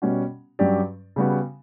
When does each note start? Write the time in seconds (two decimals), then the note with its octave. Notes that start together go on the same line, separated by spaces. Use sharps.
0.02 B2 G3 C#4 F#4
0.59 G2 F#3 C#4 G4 D5
1.16 C#3 G3 B3 F#4